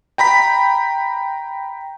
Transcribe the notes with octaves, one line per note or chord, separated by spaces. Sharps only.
G5 A#5 B5 B6